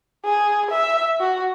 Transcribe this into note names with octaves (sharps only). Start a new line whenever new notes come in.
G#4
E5
F#4